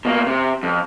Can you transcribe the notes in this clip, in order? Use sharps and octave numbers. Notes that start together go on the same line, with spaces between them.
B2 A#3
C3
F2